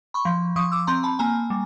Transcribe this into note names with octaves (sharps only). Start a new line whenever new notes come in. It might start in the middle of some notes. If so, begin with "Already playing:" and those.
B5 C#6
F3
F3 C#6 D#6
D6 E6
C4 A#5 C6
A5 B5
A#3 G#5 A#5
G3